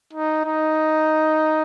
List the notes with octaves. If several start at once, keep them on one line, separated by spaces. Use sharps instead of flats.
D#4
D#4